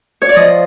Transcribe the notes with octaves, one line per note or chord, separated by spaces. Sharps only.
C#5
D5
F3 D#5